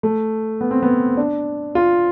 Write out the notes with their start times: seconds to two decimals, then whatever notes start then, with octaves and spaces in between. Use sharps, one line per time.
0.03 A3
0.61 B3
0.71 C4
0.82 B3
1.17 D4
1.75 F4